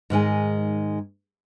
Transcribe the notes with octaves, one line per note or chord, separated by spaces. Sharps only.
G#2 D#3 G#3 G#5